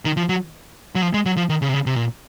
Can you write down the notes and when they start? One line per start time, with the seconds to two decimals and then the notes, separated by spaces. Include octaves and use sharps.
0.05 D#3
0.17 F3
0.29 F#3
0.95 F#3
1.02 F3
1.14 G#3
1.26 F#3
1.37 F3
1.49 D#3
1.62 C#3
1.69 C3
1.74 C#3
1.86 C3
1.96 A#2